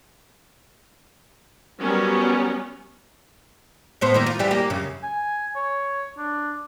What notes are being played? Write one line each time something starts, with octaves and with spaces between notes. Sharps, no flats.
F#3 G3 B3 C#4 A#4
A2 B3 C5
D#3 A#3 E4
F4
E3 G3 G4
A#3 G4
F#2 C#3
G#5
C#5
D4